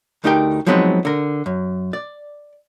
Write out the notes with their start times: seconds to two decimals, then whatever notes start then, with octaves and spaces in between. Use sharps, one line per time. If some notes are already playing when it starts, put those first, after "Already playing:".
0.24 D2 A3 D#4 G4 A#4 G5
0.66 F3 F#3 G#3 B3 C4 D#4
1.05 D3 A#4
1.46 F#2
1.93 D5